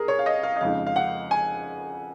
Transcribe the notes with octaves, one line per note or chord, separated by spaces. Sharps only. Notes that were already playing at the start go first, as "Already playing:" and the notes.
Already playing: C2 G#4 A#4
C#5
F5
D#5
F5
D#5
F2 C#3 G#3 D#4 F5
F5
F#5
G#5